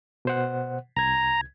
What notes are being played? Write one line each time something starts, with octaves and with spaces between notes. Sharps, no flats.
B2 C5 F#5
C2 A#5 G#6